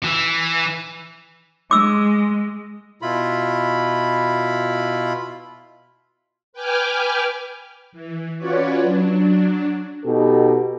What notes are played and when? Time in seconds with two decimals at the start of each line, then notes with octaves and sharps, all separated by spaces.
0.03 E3
1.71 G#3 D6 E6
3.02 B2 E4 F4 B5
6.53 B4 G5 G#5 D6 F6
7.92 E3
8.38 C#4 F4 F#4 B4 C#5 D5
8.82 F#3 D4
10.05 B2 D#4 G4 A4